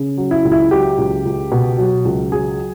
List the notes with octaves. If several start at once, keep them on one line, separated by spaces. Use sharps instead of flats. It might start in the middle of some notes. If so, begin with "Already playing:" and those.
Already playing: C#3
F#3
E4
C#2
E4
F#3 G4
C#2
C#2
B2
F#3
C#2
F#3 G#4